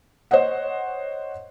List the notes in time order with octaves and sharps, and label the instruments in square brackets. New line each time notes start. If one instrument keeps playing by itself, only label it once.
[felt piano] C5 C#5 D#5 F#5